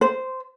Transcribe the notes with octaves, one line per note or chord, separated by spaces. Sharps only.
C5